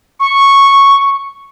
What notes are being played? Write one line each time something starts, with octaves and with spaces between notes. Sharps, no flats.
C#6